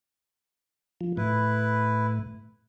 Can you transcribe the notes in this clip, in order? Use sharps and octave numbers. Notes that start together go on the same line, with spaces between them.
F3
A2 E4 B4